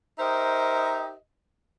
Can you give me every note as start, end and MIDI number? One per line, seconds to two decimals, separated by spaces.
0.19 1.14 63
0.19 1.14 67
0.19 1.14 70
0.19 1.14 72
0.19 1.14 75
0.19 1.14 76